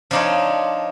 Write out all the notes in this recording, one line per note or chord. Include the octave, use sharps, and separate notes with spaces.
F3 D4 D#4 F4 C#5